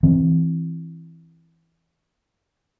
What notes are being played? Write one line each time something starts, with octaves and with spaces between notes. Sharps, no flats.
E3 C4